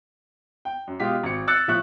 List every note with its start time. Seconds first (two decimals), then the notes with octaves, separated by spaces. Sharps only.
0.65 G5
0.87 F#2
1.00 B2 G#3 F4 G4 B6
1.24 G#1 C#7
1.48 E6 F#6 A6 C#7
1.68 A2 F3 E5 C#6 F#6